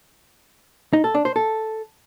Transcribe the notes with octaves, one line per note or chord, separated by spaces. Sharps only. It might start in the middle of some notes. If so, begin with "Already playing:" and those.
D#4
A4
D4
C5
A4